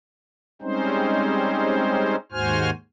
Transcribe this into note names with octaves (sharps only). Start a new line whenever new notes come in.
G3 G#3 C4 C#4 D#4 C5
D#2 G#2 F#4 C5 G#5 F6